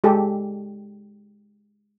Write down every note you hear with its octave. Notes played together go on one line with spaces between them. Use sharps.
G#3 G4 A4